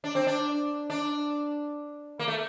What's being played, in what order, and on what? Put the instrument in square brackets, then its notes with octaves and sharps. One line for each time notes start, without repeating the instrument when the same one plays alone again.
[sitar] D4
C4
D4
D4
A#3
A3